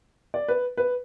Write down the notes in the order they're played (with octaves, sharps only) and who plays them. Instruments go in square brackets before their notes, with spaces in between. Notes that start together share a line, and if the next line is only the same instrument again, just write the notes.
[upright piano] D5
B4
B4